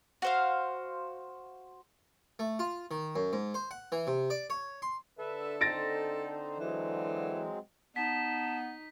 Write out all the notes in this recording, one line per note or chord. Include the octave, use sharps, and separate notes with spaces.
F#4 C5 F5
A3
F4
D#3
F#2
G#2
C5
F#5
E3
C3
D5
C#5
C6
D3 A4 B4 E5
C4 D#4 C5 A6 A#6 D7
E3 F#3 G#3 C4
B3 D#4 A5 B6